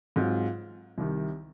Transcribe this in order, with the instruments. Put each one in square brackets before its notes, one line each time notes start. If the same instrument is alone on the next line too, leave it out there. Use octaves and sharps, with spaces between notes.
[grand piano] G#2 F#3 C4 F4
C2 C3 D#3